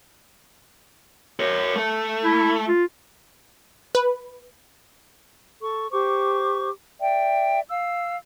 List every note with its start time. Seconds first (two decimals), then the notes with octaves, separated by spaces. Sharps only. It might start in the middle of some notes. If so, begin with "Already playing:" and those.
1.40 A#4 C#5
1.76 A3
2.24 E4
2.68 F4
3.95 B4
5.62 A4 C#6
5.92 G4 C5 C#6 D6
7.00 D5 E5 G5
7.69 F5 E6